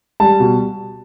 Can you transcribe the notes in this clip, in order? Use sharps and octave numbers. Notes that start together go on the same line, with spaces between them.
G3 A5
B2